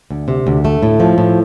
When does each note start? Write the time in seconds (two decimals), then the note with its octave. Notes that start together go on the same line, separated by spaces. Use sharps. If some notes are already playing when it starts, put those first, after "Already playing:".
0.10 D2
0.28 C3
0.47 D2
0.65 A3
0.83 A2
1.00 F3
1.18 A2